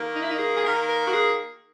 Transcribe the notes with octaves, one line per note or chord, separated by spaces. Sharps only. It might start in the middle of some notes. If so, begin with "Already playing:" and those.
Already playing: D#3 A#3
D#4
E4
D#4
G#4
G#4
D#3 A#3 A#4
A#4
F#4
G#4